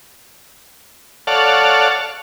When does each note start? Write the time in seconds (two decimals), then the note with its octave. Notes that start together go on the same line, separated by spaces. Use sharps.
1.27 A4 C#5 D5 F5 F#5 A5